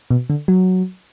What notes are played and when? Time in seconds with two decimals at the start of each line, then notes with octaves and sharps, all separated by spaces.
0.10 B2
0.30 D3
0.48 F#3